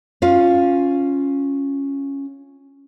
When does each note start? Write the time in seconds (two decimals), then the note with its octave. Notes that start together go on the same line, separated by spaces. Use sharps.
0.22 C#4 F4 F5